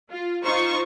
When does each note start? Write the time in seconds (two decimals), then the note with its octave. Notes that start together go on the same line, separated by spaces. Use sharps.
0.11 F4
0.44 D#4 F4 C5 C#6